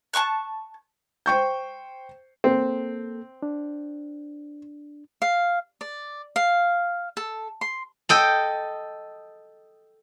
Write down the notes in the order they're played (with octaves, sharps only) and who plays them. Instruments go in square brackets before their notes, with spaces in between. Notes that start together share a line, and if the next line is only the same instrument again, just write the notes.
[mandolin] A5 A#5 C#6 F#6
[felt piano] C5 G5 C#6 G6
[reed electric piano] A#3 A4 [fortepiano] C4
[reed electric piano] D4
[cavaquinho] F5
D5
F5
A4
C6
[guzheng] A4 D#5 G5